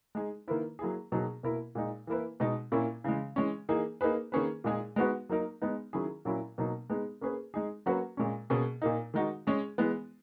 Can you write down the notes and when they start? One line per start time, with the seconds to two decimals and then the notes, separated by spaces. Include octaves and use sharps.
0.15 G#3 D#4 G#4
0.48 D#3 A#3 E4 B4
0.79 F#3 A#3 E4 G#4
1.12 B2 F#3 A#3 D#4 G#4
1.43 B2 A#3 E4 A#4
1.75 A#2 G#3 D#4
2.07 E3 A#3 E4 B4
2.40 B2 G#3 D#4
2.72 A#2 A#3 C#4 E4
3.04 C#3 E3 G#3
3.36 E3 G#3 C#4
3.69 E3 A#3 D#4 G#4
4.01 A#3 D#4 G#4 B4
4.32 D#3 A#3 C#4 G#4 B4
4.64 A#2 G#3 D#4 G#4
4.96 G#3 B3 D#4 F#4 B4
5.29 F#3 A#3 D#4 A#4
5.62 G#3 B3 D#4
5.93 D#3 F#3 C#4 E4 G#4
6.25 A#2 F#3 C#4 E4 A#4
6.58 B2 F#3 A#3 D#4
6.90 G#3 B3 D#4 G#4
7.21 A#3 C#4 G#4 B4
7.54 G#3 D#4 G#4
7.86 F#3 A#3 C#4 F#4 B4
8.17 A#2 G#3 C#4
8.50 B2 A#3 C#4 G#4
8.82 A#2 A#3 D#4
9.14 D#3 G#3 D#4 F#4
9.47 G#3 C#4 G#4
9.78 E3 G#3 B3